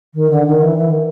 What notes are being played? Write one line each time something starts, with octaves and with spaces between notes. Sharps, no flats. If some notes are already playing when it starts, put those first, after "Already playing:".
D#3
D3
D#3
E3
E3
D#3